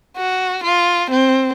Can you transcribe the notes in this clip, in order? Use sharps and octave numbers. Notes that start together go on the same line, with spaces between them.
F#4
F4
C4